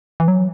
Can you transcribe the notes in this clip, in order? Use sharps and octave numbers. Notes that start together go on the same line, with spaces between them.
E3
F#3